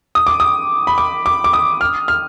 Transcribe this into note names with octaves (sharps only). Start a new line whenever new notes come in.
D#6
D6
D#6
B5
D6
D6
D6
D#6
F6
F6